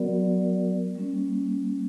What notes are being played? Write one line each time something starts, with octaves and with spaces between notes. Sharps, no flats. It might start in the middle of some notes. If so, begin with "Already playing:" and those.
Already playing: F#3 B3 F#4 A#4 D5
G3 A#3 C#4